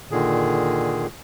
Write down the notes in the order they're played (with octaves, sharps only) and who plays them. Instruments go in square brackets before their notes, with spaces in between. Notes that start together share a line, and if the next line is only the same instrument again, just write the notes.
[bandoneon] A#2 D3 D#3 G#4